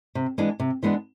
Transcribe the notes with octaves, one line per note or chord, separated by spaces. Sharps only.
C3
E3 G#3 B3 D4
C3
E3 G#3 B3 D4